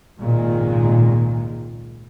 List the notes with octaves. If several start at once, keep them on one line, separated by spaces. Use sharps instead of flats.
G#1 C#2 A#2 D#3 G#3 A#3